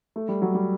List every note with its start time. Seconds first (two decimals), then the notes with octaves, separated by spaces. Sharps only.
0.16 A3
0.29 G3
0.42 F#3
0.55 G3